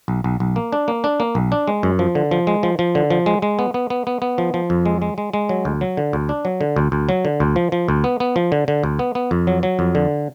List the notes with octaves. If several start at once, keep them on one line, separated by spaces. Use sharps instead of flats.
B1
B1
B1
A#3
D4
A#3
D4
A#3
B1
D4
G#3
F#2
F3
D3
F3
G#3
F3
F3
D3
F3
G#3
G#3
B3
B3
B3
B3
B3
F3
F3
F2
G#3
G#3
G#3
G#3
F#3
D2
F#3
D3
D2
D4
F#3
D3
D2
D2
F#3
D3
D2
F3
F3
D2
B3
B3
F3
D3
D3
D2
B3
B3
F2
F#3
F#3
F2
D3